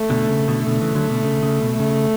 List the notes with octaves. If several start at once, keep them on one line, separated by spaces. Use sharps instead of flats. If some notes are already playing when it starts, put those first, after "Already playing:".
Already playing: A3
B2 D3
C#3
B2 D3
B2 D3 A3
C#3 E3
D3 F#3
B2 D3
C#3
C#3
B2
C#3 A3